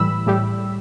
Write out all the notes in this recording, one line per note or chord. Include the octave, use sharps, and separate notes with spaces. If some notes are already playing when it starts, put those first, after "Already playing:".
Already playing: A2 E3 G3 B5 E6
A2 G3